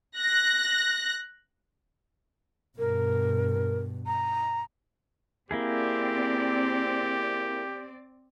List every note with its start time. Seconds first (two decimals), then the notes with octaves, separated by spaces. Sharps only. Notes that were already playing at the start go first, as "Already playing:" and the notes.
0.18 F#6 A#6
2.78 G2 B2 A#4
4.06 A#5
5.51 A#3 C4 E4 G4 G#4 D5